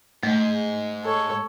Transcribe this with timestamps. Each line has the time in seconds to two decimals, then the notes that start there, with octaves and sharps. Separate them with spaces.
0.23 G#2 A3
1.04 A4 C#5